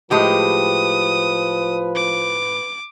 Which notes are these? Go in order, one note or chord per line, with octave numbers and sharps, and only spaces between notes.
A2 F3 G#3 G4 B4 D#6
D6